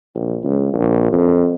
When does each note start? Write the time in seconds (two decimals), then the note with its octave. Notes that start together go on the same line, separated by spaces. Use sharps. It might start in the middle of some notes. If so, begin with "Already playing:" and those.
0.15 A#1
0.44 C#2
0.73 A#1
1.12 F2